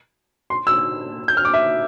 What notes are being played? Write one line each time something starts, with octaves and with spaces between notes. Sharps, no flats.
C6
E6
G6
F6
D6
E5